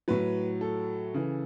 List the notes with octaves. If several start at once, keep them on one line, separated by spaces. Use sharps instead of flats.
A2 F#3 B4
A4
C#3 E3